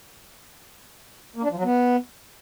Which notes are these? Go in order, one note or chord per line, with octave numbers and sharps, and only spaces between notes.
A#3
D4
F3
F#3
B3